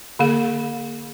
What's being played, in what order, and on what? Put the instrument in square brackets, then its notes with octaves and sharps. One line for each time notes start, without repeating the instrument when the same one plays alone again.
[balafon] D3 A#3 G#4